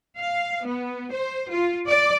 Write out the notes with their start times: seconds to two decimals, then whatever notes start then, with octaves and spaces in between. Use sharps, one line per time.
0.18 F5
0.66 B3
1.12 C5
1.49 F4
1.86 D5